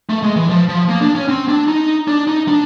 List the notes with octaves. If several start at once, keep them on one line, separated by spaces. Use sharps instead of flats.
A3
G#3
E3
F3
F3
A#3
D4
C#4
C4
D4
D#4
D4
D#4
D4